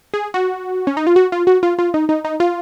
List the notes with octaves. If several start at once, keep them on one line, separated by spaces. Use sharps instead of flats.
G#4
F#4
C#4
D#4
F4
F#4
F4
F#4
F4
F4
D#4
D#4
D#4
F4